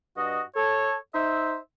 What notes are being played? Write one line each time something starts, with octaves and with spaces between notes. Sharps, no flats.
G2 F#4 D#5
A4 C#5
D#4 C5 E5